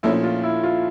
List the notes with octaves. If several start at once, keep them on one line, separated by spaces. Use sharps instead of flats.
A#1 A#2 F3 A3 C#4 E4
F4
E4
F4